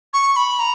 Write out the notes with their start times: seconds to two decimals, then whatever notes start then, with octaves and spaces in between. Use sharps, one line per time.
0.13 C#6
0.36 B5
0.59 A#5